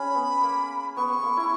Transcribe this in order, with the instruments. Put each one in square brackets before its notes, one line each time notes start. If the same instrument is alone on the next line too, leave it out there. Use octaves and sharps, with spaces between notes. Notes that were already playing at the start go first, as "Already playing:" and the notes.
Already playing: [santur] C#4 G#4 [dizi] B5
[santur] B3
A#3
[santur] B3 [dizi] C#6
[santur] B3
A#3
E4